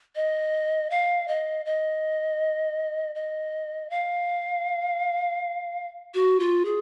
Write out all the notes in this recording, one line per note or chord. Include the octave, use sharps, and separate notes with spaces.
D#5
F5
D#5
D#5
D#5
F5
F#4
F4
G#4